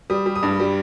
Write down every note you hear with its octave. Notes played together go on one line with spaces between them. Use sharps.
G3 D#6
G3
D#6
G2
G3